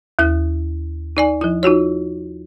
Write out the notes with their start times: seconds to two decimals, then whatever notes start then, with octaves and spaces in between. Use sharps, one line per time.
0.19 D#2 E4 F#6
1.17 D#4 D5 G#5
1.41 F3 E4
1.63 D#4 F4 F#4 C#5